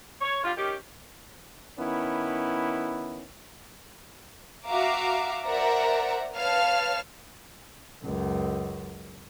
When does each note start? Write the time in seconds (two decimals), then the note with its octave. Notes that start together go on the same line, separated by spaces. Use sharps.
0.21 C#5
0.43 D3 G3 F4
0.56 D#3 C#4 G4
1.78 D#3 B3 C#4 E4
4.66 F#4 E5 F5 A#5 D6
5.44 A#4 C5 D5 E5 F#5 A#5
6.37 B4 C#5 F5 A5 F6
8.03 C#2 F#2